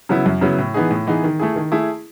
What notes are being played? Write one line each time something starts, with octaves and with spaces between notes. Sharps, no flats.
C#3 F#3 B3 E4
F#2
C#3 F#3 B3 E4
A2
E3 B3 D#4 G#4
A2
E3 B3 D#4 G#4
D#3
A3 E4 G#4
D#3
A3 E4 G#4